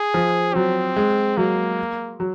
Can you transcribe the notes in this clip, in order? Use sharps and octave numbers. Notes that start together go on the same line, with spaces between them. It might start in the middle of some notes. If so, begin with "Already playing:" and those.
Already playing: G#4
F3
F#3 C4
G#3
F#3 A#3
F#3